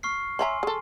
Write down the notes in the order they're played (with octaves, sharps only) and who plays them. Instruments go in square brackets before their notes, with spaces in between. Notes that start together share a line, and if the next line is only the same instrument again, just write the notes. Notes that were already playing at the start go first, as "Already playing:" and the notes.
[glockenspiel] C#6 F6 C7
[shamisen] C#5 E5 A#5 [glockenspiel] G#5 C6
[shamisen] G#4 A4